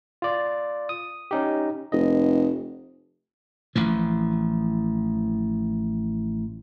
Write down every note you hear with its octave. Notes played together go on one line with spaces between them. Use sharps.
F4 D5
D#6
C#4 D#4 G4
F1 D#5
A1 E3 F3